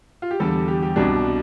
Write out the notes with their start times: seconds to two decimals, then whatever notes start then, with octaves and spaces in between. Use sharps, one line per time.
0.22 F4
0.31 G4
0.40 E2 D3 G3 A4
0.68 G4
0.82 G4
0.96 C2 B2 G3 D4